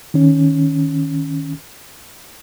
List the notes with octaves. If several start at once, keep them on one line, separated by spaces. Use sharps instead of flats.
D#3 C#4